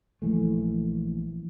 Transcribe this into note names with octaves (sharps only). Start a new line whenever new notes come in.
A#1 E3 A3